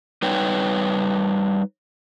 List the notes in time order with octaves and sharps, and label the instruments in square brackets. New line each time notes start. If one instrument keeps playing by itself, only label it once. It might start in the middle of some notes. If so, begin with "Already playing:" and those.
[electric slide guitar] G3 D#4 B4 C#5 G5